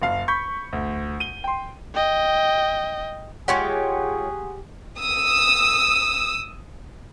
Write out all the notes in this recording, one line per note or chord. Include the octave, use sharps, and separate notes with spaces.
F#1 F5
B5 C#6 G6 B6
D2
D#7 G7
G5 C6
D#5 G5
G#3 F4 G4 G#4 C#5 F#5 C6 C#6
D#6 E6